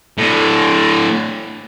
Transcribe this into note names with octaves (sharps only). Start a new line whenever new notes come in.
A2 D3